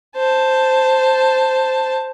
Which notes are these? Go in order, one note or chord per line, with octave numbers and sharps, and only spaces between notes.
C5 A5